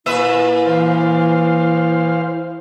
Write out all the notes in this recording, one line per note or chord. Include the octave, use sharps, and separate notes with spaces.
A#2 E4 B4 E5
E3 C5 F5